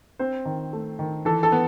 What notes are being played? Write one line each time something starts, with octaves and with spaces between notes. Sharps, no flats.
C4 C5
D#3
A3
D#3
E3 A4
A4
B3